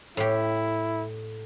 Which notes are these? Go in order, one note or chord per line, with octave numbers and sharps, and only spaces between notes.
A2 E4 G4